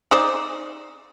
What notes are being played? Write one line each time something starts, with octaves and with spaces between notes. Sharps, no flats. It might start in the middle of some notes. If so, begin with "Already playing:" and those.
D#4 C5 D5